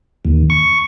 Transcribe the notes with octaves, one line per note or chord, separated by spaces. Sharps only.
D#2
C#6